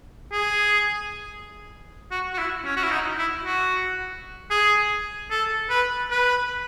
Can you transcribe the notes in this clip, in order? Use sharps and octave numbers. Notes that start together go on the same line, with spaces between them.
G#4
F#4
F#4
E4
C#4
F#4
E4
D#4
E4
F#4
G#4
A4
B4
B4